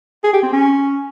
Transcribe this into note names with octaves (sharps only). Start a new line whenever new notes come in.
G#4
G4
C4
C#4